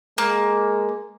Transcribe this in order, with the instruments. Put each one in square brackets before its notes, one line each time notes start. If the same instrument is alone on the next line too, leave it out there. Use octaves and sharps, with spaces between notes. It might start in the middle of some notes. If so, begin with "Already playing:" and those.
[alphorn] G#3 [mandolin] A#3